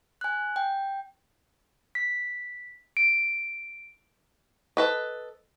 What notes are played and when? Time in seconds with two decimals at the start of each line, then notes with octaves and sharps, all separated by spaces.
0.21 G#5 F#6
0.56 G5
1.95 B6
2.97 D7
4.77 A4 B4 D#5